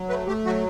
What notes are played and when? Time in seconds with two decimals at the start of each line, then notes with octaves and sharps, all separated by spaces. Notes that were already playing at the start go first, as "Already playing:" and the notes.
Already playing: F#3
0.09 A3 B4
0.27 A3 G4
0.45 F#3 F#4